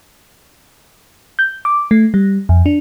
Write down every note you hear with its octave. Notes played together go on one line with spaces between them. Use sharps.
G6
D6
A3
G3
F2
D4